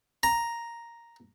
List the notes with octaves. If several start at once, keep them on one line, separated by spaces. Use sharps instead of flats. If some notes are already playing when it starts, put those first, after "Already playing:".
A#5